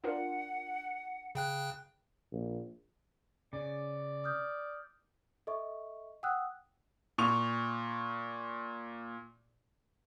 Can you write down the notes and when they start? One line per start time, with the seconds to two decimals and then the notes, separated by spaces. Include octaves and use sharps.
0.04 D4 F4 A#4 F#5
1.35 C#3 G5 F#6
2.32 A#1
3.53 C#3 D5
4.24 D#6 F6 G6
5.47 A4 D#5 E5 C#6
6.23 F#5 G5 D#6 E6 F#6
7.18 A#2 C#6 F7